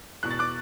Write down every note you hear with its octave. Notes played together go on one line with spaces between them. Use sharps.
E2 B2 F#6
A6
D6 F#6